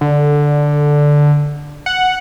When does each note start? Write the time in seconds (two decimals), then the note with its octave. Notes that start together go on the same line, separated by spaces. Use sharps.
0.01 D3
1.86 F#5